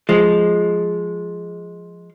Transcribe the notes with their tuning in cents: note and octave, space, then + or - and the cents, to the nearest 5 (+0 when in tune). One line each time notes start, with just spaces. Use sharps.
F3 +0 G#3 +5